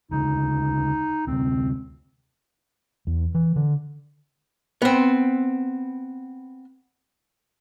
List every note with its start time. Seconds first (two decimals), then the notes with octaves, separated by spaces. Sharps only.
0.11 D2 C#3 D#4
1.27 D2 C3 C4
3.07 E2
3.35 E3
3.56 D3
4.82 B3 C4